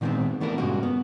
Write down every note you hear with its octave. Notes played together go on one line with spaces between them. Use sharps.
A#2 D#3 G#3 A3 B3 C4
E3 A3 B3 D4 A#4
G2 A#2 C#3 G#3 A#3 F#4
B3